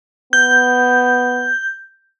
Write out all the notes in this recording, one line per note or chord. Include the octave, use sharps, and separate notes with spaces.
B3 G6